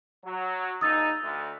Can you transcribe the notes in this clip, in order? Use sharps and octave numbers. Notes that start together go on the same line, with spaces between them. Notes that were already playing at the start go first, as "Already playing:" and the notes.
F#3
A#1 D#4 D#6 E6 A6
D2